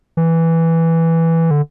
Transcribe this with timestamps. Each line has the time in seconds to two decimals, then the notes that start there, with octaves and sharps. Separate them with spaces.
0.17 E3
1.51 D3